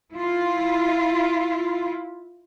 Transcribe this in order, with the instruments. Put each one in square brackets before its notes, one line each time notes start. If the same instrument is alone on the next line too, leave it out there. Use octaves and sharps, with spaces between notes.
[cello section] E4 F4